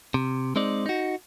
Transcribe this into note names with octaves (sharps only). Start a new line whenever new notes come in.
C3
G#3 C4 D#4 D5
D#4 F#4